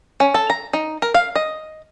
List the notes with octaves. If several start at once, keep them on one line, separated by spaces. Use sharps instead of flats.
C#4
A4
A#5
D#4
A#4
F5
D#5